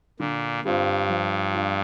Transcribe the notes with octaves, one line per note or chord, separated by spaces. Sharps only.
A#2 D3
G2 G3 C4 F4
F3
D4 F4